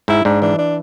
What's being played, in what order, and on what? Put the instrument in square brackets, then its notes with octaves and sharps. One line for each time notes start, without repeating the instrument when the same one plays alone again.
[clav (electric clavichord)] G#2 [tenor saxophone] E4
[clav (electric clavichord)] G#2 [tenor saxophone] D4
[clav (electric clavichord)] E3 [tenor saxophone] D4
[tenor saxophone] D4